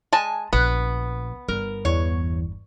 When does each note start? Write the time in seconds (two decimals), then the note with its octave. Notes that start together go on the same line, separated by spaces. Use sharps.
0.13 G#3 G#5 A5
0.53 A#1 B3 B4
1.48 G1 A#4
1.85 E2 C#5